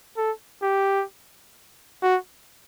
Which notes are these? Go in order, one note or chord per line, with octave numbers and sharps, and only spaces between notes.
A4
G4
F#4